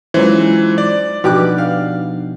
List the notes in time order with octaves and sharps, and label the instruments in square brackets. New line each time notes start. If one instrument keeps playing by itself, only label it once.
[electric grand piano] E3 [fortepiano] F#3 C#4 C5 [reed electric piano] G#3 D#4 F4
[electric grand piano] D5
[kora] B2 G4 [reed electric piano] F3 D4 D#4 [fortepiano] B4 D6 F#6
[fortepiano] F5